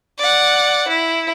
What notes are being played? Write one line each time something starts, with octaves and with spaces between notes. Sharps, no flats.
D5 F#5
E4